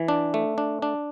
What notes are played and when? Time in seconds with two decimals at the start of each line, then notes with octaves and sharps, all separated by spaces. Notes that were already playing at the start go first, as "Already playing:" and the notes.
Already playing: E3
0.08 D4
0.34 A3
0.58 D4
0.82 D4